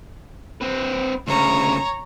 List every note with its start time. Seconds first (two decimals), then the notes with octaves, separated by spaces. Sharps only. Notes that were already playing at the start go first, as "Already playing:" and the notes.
0.61 C4 B4
1.27 D2 C#3 C#5 A#5